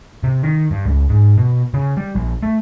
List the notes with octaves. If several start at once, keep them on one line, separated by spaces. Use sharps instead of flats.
C3
D#3
G2
C#2
G#2
B2
C#3
G3
A#1
A3